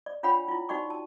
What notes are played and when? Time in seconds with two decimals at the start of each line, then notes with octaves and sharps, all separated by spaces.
0.06 D5
0.23 D4 F4 C#5 F#5 G5 B5
0.48 E4 F4
0.69 D#4 F#4 D5 G5 C#6
0.90 A5